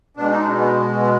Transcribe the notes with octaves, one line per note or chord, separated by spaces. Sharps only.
B2 G#3 D4
D#4
D4
B3
B3